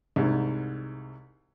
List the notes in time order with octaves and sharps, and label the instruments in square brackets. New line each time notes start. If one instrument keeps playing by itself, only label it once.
[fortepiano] C2 G#2